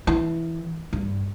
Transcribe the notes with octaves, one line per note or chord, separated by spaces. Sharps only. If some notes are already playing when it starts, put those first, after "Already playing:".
E3
G2